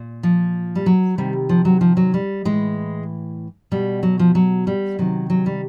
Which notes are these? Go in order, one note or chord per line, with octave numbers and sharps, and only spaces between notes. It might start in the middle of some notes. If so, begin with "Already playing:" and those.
Already playing: A#2
F3
G3
F#3
C3 D#3 G3
F3
F#3
F3
F#3
G3
A2 E3 G#3
B2 G3
F#3
F3
F#3
G3
C3 D#3 F#3
F#3
G3